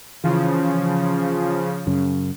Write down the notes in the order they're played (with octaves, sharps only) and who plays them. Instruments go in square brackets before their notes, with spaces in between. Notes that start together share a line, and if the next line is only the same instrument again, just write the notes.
[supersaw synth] C#3 F3 [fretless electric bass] E3
[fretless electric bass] F#2 C#3